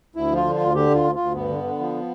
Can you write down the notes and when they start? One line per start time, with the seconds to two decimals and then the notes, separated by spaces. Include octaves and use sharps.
0.15 D2 E4
0.31 F3
0.36 F4
0.46 D3
0.55 D2 F4
0.75 D3 G4
0.90 D2 F4
1.05 D2
1.15 D2 F4
1.34 G2 B3
1.49 D3
1.64 D3
1.79 F3